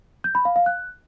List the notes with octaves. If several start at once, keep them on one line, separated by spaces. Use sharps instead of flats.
G6
B5
F5
F5
F#6